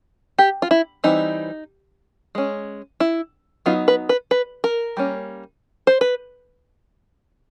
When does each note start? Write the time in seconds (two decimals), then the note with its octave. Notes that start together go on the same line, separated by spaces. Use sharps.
0.39 G4
0.62 F4
0.71 E4
1.04 E3 G3 C4 D#4
2.35 G#3 C#4
3.00 E4
3.66 F#3 B3 D#4 F4
3.88 B4
4.09 B4
4.31 B4
4.64 A#4
4.97 G3 A#3 C#4
5.87 C5
6.01 B4